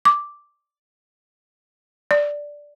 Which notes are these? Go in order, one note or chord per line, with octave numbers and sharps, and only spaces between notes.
D6
D5